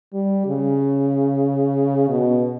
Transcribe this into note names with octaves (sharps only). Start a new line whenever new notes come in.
G3
C#3
B2